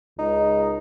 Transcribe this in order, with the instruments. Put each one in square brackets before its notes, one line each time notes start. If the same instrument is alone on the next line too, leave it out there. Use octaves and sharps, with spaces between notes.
[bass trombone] C#2 [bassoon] D#4